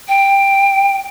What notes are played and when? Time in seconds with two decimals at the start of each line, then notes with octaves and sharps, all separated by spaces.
0.08 G5